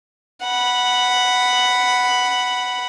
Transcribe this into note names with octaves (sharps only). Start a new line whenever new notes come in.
F#5 B5